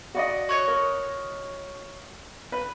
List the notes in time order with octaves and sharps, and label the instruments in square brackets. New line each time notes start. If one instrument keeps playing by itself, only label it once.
[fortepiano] F#4 D5 D#5
[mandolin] F#4 C#5 D#5
[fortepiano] A#4
B4